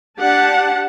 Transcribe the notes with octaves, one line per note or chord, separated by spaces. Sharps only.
D4 G4 F#5 A5